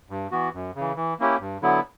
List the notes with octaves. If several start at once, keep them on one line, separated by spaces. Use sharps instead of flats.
G2
E3 B3 F#4
F#2
C#3 E3
E3
A#3 C#4 E4 G4
G2
D3 F#3 B3 E4